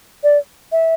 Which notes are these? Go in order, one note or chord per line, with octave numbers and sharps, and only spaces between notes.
D5
E5